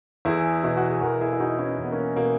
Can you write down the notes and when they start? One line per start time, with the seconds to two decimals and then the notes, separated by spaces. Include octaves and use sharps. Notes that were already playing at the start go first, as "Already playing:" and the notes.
0.25 E2 E4 G#4
0.64 B2 E4
0.77 F#4
0.88 G#4
1.01 E2 F#4 A#4
1.21 E4 G#4
1.33 E4
1.39 B2 D#4 F#4
1.59 C#4 E4
1.78 E2 C#4
1.84 B3
1.91 A#3 C#4
2.16 B2 A#3